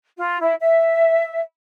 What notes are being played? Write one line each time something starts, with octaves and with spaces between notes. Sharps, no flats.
F4
E4
E5